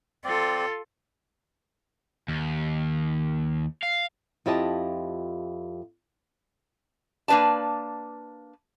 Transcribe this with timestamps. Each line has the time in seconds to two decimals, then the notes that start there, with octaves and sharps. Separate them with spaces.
0.24 C4 F4 A4 D5
2.28 D#2
3.83 F5
4.46 F2 E4 F4 G4 D#5 A5
7.28 A#3 D4 B4 D5 A5